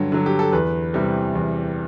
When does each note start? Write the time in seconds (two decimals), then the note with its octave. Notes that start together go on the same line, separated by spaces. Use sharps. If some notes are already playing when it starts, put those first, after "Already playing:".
Already playing: G2 D3 F#3
0.12 D3 F#3
0.26 G4
0.39 A4
0.52 E2 B4
0.94 C3 E3 G3
1.35 E2